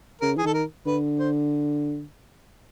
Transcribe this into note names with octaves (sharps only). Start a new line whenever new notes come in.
C#3 A#4
E3 G#4
D#3 A4
A#4
D3 B4
C5